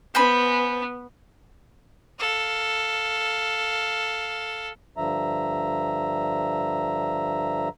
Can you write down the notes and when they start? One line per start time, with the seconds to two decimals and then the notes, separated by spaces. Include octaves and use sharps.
0.15 B3 C5 G#5 B5
2.19 A4 F5
4.97 G2 D3 F3 E5 A#5